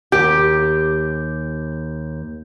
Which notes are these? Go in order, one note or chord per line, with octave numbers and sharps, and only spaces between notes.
D#2 G4 G6